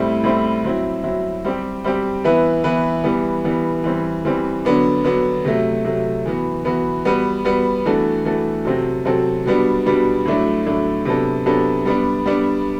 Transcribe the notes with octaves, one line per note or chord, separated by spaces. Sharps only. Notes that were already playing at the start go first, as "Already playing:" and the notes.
Already playing: A2 G3 C4 E4
A2 G3 C4 E4
F#3 C4 E4
F#3 C4 E4
G3 C4 G4
G3 C4 G4
E3 B3 E4 B4
E3 B3 E4 B4
E3 G3 B3
E3 G3 B3
E3 G3 C4
E3 G3 C4
D3 F#3 B3 D4
D3 F#3 B3 D4
C3 F#3 A3
C3 F#3 A3
E3 B3 F#4
E3 B3 F#4
G3 B3 F#4 B4
G3 B3 F#4 B4
E3 A3 D4 F#4 A4
E3 A3 D4 F#4 A4
C3 F#3 C4 F#4 A4
C3 F#3 C4 F#4 A4
B2 G3 B3 D4
B2 G3 B3 D4
A2 F#3 A3 D4
A2 F#3 A3 D4
C3 F#3 B3 D4 A4
C3 F#3 B3 D4 A4
G3 B3 D4
G3 B3 D4